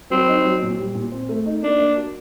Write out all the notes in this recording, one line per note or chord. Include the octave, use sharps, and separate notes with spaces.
F#3 C4
D#4
F#3
A#2
G3
A#2
C4
A3
D#4
A#3 D4
A#3
F#4